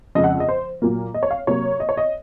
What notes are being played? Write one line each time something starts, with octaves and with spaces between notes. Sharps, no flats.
F2 C#3 G#3 D#5
F#5
D#5
C5
A#2 F#3 A#3
D#5
C#5
F5
C3 F#3 A#3 C#5
D#5
C#5
D#5